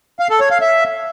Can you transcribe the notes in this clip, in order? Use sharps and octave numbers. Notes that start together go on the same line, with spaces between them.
F5
A4
C#5
F5
E5